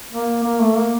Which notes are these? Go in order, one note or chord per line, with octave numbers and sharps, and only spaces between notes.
A#3
A#3
A3
A#3